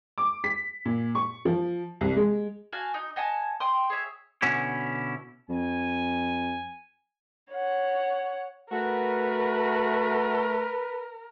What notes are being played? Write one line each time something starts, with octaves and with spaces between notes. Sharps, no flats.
D6
B6
A#2
C#6
F3
C2
G#3
F#4 F5 G#5 A5
D#4
D#5 F#5 G#5 A5
G5 C6 D#6
G#4 C#5 E5
B2 D3 C#4 E4
F2 G#5
C#5 F#5
A3 F#4 A#4 B4